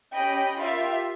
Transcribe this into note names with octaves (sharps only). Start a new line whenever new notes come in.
C#4 G4 D#5 G5 B5
F4 G4 A#4 E5